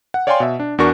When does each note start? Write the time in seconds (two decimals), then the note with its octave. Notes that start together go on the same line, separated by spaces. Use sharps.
0.14 F#5
0.27 C#5 D5 F5 G5 G#5 C6
0.40 B2 E5
0.60 D4
0.78 E2 D4 F#4 A#4 C#6 A#6